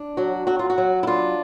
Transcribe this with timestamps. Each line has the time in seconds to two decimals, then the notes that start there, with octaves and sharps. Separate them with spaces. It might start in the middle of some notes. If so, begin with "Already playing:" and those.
Already playing: D4
0.17 F#3 F#4
0.47 F#3 F#4
0.59 F4
0.70 F#4
0.78 F#3
1.03 E4
1.07 D4 F4